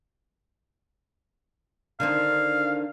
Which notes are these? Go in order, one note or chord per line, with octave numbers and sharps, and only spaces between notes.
D3 D#3 C4 F5